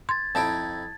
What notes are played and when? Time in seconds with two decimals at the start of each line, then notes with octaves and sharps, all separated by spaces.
0.09 C6 G#6 A6
0.35 F2 D#4 E4 A5 D7